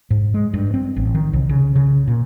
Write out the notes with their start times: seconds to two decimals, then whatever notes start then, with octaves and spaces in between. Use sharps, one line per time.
0.10 G#2
0.34 G#3
0.54 G2
0.74 C4
0.96 A1
1.14 D#3
1.33 C2
1.49 C#3
1.76 C#3
2.08 A#2